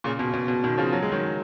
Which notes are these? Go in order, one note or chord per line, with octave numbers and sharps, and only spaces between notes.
A#2 C#3
B2
B2
B2
B2 D#3
C#3 F3
F#3
G#3
D#3 F#3